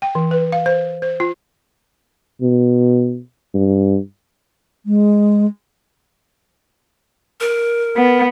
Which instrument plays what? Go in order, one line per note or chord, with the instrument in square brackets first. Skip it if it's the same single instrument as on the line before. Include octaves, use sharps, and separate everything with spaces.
[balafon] G5
E3
B4
F5
C5
C5
F4
[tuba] B2
G2
[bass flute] G#3
[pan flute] A#4
[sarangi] B3